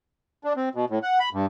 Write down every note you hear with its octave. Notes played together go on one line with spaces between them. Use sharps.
D4
C4
B2
A2
F#5
B5
G2